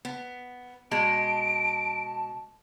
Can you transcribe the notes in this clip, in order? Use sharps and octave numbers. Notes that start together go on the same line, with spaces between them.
B3
B2 G#3 A5 D7